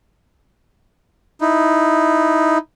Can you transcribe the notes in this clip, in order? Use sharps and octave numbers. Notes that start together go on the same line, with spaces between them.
D#4 E4